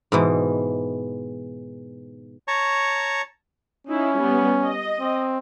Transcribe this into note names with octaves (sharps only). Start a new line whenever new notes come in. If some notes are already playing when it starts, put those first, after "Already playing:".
G#2 B2 E3
C#5 A5 A#5 C#6
C#4 D#4 E4
G3 B3
D#5
C4